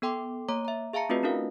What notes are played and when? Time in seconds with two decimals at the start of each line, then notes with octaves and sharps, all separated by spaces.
0.02 B3 A4 G5 C6 D6
0.49 A#3 C#5 A#5 D6
0.65 E5 A#5
0.93 G#4 E5 F5 A5 A#5 C#7
1.09 A3 C4 F4 F#4 B4 D#5
1.23 C#4 D4 E4 F#4 A#4 F5